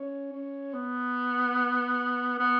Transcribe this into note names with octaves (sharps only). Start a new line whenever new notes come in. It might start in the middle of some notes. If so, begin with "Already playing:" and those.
Already playing: C#4
C#4
B3
B3